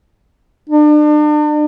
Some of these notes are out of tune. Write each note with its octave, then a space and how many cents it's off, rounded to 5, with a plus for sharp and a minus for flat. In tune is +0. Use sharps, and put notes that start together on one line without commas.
D4 +40